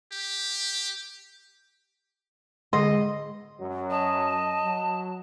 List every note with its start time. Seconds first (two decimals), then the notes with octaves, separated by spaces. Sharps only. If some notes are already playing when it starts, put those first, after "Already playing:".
0.12 G4
2.73 D3 G#3 D#5 C6
3.60 F#2 F#3
3.91 D#5 A5
4.64 F#3